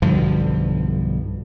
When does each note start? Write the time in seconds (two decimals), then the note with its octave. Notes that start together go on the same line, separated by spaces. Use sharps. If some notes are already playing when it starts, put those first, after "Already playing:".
0.02 B1 G2 D3 F3